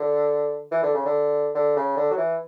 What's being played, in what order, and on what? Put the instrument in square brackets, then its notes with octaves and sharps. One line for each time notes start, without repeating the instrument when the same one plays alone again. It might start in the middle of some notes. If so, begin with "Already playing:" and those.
Already playing: [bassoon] D3
E3
D3
C#3
D3
D3
C#3
D3
F#3
E3